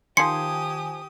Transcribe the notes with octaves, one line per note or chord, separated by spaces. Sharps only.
D#3 F3 G4 G#5 C6 D#6 C#7